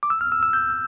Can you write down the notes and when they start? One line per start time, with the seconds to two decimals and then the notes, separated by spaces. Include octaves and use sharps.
0.03 D6
0.10 E6
0.21 F6
0.32 E6
0.43 E6
0.53 G6